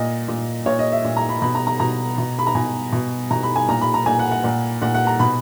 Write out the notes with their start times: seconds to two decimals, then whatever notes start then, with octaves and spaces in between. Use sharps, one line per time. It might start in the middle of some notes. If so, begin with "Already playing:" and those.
Already playing: A#2 D#5
0.28 A#2
0.66 A#2 C#5
0.79 D#5
0.92 E5
1.04 A#2
1.17 A#5
1.29 B5
1.42 B2 B5
1.55 A#5
1.67 A#5
1.80 B2 A#5
2.18 B2
2.39 B5
2.47 A#5
2.55 B2 G#5
2.92 B2
3.31 B2 A#5
3.43 B5
3.56 G#5
3.68 A#2 A#5
3.81 B5
3.94 A#5
4.06 A#2 G#5
4.19 F#5
4.31 F#5
4.44 A#2
4.82 A#2 F#5
4.94 F#5
5.07 A#5
5.20 B2 B5